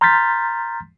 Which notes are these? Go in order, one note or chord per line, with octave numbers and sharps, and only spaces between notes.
A#5 C6 F6 G6 A6 B6